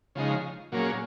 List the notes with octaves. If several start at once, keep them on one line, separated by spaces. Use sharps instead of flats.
C#3 F3 G#3 D#4
A#2 F#3 A#3 C#4 G#4